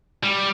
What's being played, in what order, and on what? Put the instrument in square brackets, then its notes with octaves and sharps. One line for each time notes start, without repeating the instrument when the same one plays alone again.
[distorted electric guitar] G3